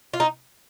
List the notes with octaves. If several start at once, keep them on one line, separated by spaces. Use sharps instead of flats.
F4
D#4